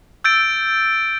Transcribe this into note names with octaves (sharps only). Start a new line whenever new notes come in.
E6 G6 A6 D7